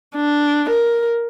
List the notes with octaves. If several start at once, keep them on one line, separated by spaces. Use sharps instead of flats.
D4
A#4